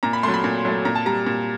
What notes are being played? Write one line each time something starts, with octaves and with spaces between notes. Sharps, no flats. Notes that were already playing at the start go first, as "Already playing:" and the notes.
A#2 A#5
B5
A3 C6
F#3
B5
A#2
F#3 A3
A#2 A#5
A5
G3 A#5
A#2